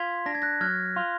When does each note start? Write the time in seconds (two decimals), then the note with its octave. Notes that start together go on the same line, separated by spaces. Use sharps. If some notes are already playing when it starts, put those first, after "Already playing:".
Already playing: F4 G#6 B6
0.26 D4 A#6
0.35 G#6
0.42 F#6 A#6
0.61 F#3 F6 G#6
0.96 F4